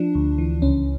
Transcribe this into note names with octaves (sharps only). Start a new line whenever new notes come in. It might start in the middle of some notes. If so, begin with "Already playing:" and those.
Already playing: F3 D4
D2
E3
C#2 C#4